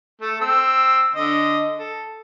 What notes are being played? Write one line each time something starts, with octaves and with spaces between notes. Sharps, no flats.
A3 A4
C4 E6
D3 D#5
A4